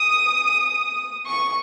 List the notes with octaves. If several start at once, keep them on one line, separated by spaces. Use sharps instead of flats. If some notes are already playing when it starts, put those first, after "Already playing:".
Already playing: D#6
C#6